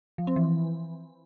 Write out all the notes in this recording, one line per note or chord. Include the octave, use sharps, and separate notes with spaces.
F3
C4
E3